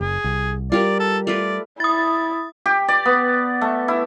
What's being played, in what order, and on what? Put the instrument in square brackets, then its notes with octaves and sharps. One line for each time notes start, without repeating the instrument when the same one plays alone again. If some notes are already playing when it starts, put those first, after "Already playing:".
[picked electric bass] F#1 [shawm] G#4
[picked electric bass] C2
[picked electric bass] G3 [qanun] F4 G4 A#4 [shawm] D5
[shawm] A4
[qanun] A3 F4 B4 [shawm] D5
[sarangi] E4 [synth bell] D#6 A6
[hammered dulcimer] G4
D5
B3
A3
E4